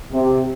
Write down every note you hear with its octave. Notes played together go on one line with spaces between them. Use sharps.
C3